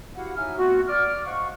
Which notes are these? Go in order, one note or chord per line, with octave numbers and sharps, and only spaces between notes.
E4 F#4 G4 F5 F#5
A2 D#4 F#4 E5 G#5 F6
A3 B3 C4 F4 F#4
D5 D6 F6
C5 D#5 F5 F#5 C#6